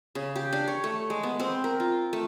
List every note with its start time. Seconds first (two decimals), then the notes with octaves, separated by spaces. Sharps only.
0.15 C#3
0.36 G4
0.53 D4
0.68 C#5
0.84 A3
1.10 G#3
1.23 B3
1.40 C4
1.64 A#4
1.80 F4
2.13 A3